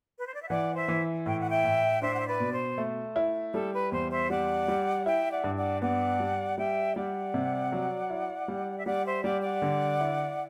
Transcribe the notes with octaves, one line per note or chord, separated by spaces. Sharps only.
B4
C5
D5
E5
E3 D5 F#5
C5 E5
E3
A2 G5
F#5
E5 G5
A2
D4 C5 E5
F#5
E5
B4 D5
B2
C5
A3
E4
G3 A4
B4
E2 C5
C5 E5
G3 D5 F#5
G3
E4 E5 G5
D5 F#5
G2
D5 F#5
B3 D5 F#5
G3
G3 E5 G5
G3 D5 F#5
C3
F#3
E4
G3
E5
G3 D5 F#5
C5 E5
G3 D5 F#5
D5 F#5
D3
E4